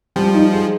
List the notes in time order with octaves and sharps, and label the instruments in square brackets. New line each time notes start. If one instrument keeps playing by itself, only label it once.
[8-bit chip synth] F3 [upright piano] G3
[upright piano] D#4
G#4